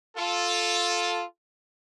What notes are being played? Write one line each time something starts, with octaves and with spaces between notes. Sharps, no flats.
F4 A4